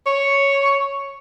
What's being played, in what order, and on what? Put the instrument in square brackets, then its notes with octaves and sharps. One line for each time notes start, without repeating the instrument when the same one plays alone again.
[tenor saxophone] C#5